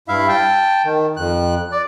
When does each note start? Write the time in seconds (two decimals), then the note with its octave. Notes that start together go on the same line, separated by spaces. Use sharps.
0.08 G2 E4 E5 F5
0.28 G5 A5
0.85 D#3
1.17 F2 F#6
1.72 D5